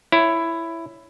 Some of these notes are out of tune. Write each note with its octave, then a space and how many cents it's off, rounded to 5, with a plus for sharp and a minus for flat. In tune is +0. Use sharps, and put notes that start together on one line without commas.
E4 +10 C#5 +0